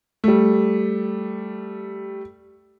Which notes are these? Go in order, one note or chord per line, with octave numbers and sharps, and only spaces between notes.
G3 A3